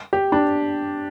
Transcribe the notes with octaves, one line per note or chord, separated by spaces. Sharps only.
G4
D4